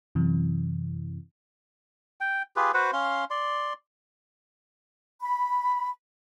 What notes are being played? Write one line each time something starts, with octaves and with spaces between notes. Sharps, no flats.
F#2 C3 E3
G5
F4 G4 G#4 B4
F#4 B4 C5 F#5
C#4 F5 C6
D5 C6
B5